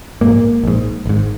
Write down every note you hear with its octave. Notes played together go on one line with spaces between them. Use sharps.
A#1 G#2 A#3
A#1 G#2
G#1 G#2